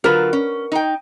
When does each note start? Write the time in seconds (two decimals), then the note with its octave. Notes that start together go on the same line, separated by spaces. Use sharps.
0.04 D3 F#3 F4 A#4 B4
0.33 C#4
0.72 D#4 G5